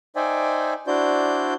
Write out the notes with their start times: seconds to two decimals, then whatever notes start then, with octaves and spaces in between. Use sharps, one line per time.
0.16 D#4 C5 D5 E5 G5 G#5
0.87 D4 E4 F#4 C5 D5 G6